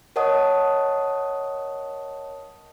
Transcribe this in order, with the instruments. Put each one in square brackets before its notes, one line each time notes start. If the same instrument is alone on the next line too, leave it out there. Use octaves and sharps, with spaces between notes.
[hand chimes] A#4 C#5 D#5 F#5 A5 D#6